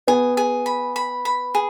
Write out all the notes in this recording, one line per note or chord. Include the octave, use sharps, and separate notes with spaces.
B3 G#4
G#4
B5
B5
B5
G#4